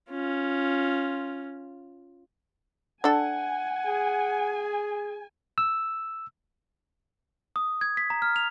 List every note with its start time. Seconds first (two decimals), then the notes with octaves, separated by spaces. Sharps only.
0.10 C#4 F4
3.04 D4 A4 F#5 G#5
3.87 G#4
5.58 E6
7.56 D#6
7.81 G#6
7.97 B6
8.10 A#5
8.22 F6
8.36 F7